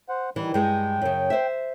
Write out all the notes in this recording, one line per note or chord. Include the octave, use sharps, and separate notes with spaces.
C5 F#5
D#3 E3 G3
G2 G#3 G5
F#2 C#3
C5 E5